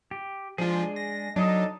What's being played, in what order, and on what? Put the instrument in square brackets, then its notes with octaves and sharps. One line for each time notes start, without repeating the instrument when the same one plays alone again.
[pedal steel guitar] G4
[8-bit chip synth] F3 F4 [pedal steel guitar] G#3 D4 G#4
[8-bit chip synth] A#6
[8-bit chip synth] F#3 [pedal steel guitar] D4 D#4 A4 [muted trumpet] D#5